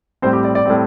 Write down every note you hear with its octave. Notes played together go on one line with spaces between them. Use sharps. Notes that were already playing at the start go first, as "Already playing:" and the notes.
A2 G3 C4 C5
G4
D5
D5
A2 G3 C4